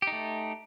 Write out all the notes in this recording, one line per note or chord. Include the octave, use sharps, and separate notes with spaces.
A3 D#4 G4